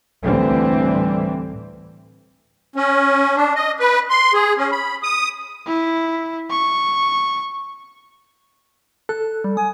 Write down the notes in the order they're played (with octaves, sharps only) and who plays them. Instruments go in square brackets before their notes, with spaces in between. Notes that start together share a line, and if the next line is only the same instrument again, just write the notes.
[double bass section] D2 A2 D3 E3 G3 C4
[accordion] C#4
D4
D#5
B4
C6
G#4
C#4
B5
D#6
[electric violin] E4
C#6
[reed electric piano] A4 [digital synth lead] F#6
[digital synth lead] G3
[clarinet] G#5 [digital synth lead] D#6